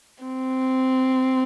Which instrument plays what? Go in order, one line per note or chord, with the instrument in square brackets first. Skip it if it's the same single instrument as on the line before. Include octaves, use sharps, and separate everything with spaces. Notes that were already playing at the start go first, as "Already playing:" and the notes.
[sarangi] C4